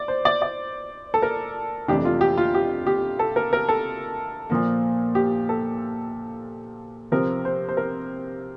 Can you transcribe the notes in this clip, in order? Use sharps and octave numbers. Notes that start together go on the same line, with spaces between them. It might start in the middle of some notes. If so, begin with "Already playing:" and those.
Already playing: D5
C5
D5
D5
A4
A#4
F2 C3 E3 A3 D4 G4
F4
G4
F4
G4
G4
A4
A#4
A#4
A4
A#2 F3 A#3
G4
A4
C3 F3 C4 A#4
C5
C5
A#4